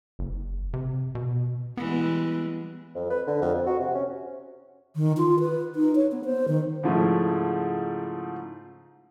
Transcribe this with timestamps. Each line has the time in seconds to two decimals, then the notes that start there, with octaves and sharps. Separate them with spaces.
0.19 F#1
0.73 C3
1.15 B2
1.77 E3 G3 G#3 B3
2.95 F2
3.10 B4
3.27 D3
3.42 F2
3.54 F2
3.66 F#4
3.80 C3
3.95 C#4
4.96 D#3
5.17 F4
5.40 B4
5.76 D#4
5.95 C#5
6.12 B3
6.25 C5
6.48 D#3
6.83 G#2 C#3 F3 A3 E4